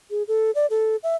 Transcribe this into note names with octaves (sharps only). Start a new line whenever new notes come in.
G#4
A4
D5
A4
E5